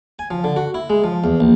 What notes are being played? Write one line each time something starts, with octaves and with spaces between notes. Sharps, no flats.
G#5
F3
D3
F#4
E4
G#3
F3
E2
A#1